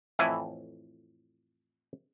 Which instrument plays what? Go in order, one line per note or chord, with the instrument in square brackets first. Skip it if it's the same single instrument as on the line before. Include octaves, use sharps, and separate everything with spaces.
[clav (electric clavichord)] F2 A2 E3 E4 G#5